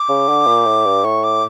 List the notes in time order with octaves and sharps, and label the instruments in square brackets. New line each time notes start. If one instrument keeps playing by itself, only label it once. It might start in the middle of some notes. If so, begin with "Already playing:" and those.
Already playing: [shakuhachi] D6
[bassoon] C#3
D3
A#2
A2
G2
[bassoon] A2 [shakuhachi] C#6
[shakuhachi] D6